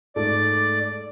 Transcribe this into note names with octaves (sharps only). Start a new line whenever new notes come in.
G#2 A3 D5 D6